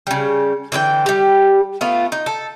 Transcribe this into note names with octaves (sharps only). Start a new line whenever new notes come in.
C#3 G3
D3 E3 C5 G5
G3 G4
A3 B3 F4 F5
D#4
A4